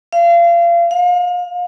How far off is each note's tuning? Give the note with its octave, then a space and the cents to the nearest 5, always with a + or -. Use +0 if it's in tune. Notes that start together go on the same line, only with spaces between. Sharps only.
F5 -30
F5 +35